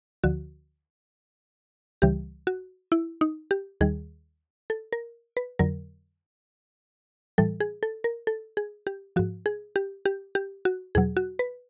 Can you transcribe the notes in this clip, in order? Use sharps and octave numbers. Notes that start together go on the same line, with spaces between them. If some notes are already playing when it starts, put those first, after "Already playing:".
D2 D3 F3 F#4
C#2 C#3 E3 G3 G4
F#4
E4
D#4
G4
D#2 D#3 G3 G#4
A4
A#4
B4
F2 D3 F#3 A#4
A2 E3 G3 A4
G#4
A4
A#4
A4
G#4
G4
G#2 F3 F#4
G#4
G4
G4
G4
F#4
E2 B2 F#3 G#4
F#4
B4